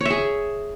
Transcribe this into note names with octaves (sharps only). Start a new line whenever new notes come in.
G#4 C#5 E5